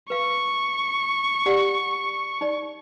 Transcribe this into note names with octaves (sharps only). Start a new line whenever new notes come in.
B4 F5 C#6
G4 D5 F#5
D#4 D5